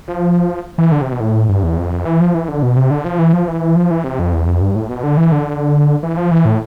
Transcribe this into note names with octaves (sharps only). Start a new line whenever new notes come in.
F3
E3
D3
C3
B2
A2
G2
E2
F2
E3
F3
E3
D3
B2
C3
D3
F3
E3
F3
E3
F3
E3
C3
F2
E2
F2
G2
A2
B2
D3
E3
D3
E3
F3
E3
A2